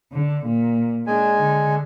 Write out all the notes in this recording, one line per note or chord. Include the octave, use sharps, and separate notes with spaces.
D3
A#2
G#3 D4 G#5
D3